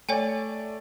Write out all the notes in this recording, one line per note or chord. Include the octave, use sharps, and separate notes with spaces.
A3 C#5 D5 G5 G#5